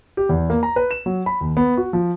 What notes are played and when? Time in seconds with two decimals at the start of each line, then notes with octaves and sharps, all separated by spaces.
0.17 G4
0.29 E2
0.50 A#3
0.63 A#5
0.76 B4
0.91 E7
1.06 F#3
1.26 B5
1.41 D#2
1.57 B3
1.77 F#4
1.93 F3